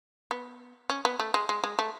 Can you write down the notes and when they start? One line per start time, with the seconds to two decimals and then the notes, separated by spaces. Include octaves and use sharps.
0.31 B3
0.90 C#4
1.05 B3
1.20 A3
1.34 G#3
1.49 G#3
1.64 G#3
1.79 A3